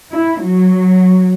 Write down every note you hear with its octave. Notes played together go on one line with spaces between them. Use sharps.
E4
F#3